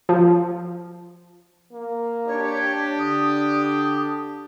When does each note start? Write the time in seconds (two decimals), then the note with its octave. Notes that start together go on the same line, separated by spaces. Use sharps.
0.09 F3
1.73 A#3
2.27 D4 G4 C#5
2.99 D3 D#6